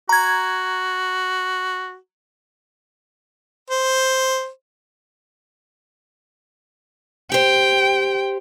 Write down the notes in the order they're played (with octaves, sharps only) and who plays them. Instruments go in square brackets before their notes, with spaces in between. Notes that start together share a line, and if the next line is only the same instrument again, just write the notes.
[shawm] F#4 [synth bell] A#5 G#6
[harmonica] C5
[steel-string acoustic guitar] G4 C5 [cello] G5